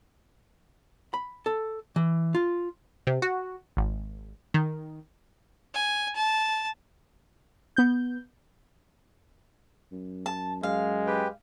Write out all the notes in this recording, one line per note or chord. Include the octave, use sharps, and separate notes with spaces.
B5
A4
E3
F4
C3
F#4
G#1
D#3
G#5
A5
B3 G6
F#2
A5
F#2 G#3 F5
G4 B4 G5